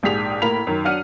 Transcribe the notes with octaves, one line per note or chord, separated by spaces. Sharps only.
A#1 G#2 G4 G#4 B6 F7
A2 A#3 A#4 B5 B6 F7
F#2 D#3
F#3 D4 F#5 F6 D#7